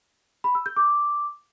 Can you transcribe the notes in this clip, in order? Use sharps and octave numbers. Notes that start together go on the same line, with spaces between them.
B5
E6
G6
D6